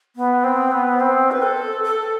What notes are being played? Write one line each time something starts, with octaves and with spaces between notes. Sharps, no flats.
B3
C4
B3
C4
B4
A4
A4